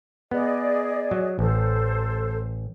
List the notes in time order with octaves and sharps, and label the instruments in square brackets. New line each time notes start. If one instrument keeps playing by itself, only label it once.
[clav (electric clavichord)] B3 [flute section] G#4 D5 D#5
[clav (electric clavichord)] F#3
[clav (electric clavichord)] A1 [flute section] A4 C5